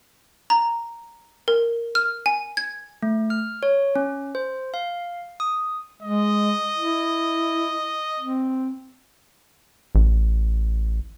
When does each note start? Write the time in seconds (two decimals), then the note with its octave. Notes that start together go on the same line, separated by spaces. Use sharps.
0.50 A#5
1.48 A#4
1.95 F6
2.26 G#5
2.57 G#6
3.03 A3
3.30 F6
3.63 C#5
3.96 C#4
4.35 C5
4.74 F5
5.40 D#6
6.03 G#3 D#5
6.78 E4
8.20 C4
9.95 A1